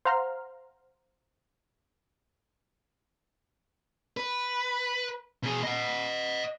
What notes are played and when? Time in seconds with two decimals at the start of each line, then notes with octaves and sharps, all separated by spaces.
0.05 C5 F5 F#5 A#5 C6 F6
4.17 B4
5.43 B2 G#4
5.63 D#5 F#5